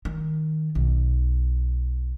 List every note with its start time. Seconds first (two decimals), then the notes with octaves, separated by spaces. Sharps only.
0.05 D#3
0.75 B1